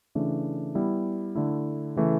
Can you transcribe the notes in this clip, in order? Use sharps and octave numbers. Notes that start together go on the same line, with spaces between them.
C#3 E3 A3 D4
G3 B3 E4
D3 A3 E4
C#3 E3 A3